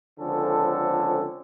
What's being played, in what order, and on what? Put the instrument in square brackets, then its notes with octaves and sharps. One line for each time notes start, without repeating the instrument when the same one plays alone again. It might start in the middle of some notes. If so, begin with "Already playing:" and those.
[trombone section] C#2 D3 F3 C4 C#4 A4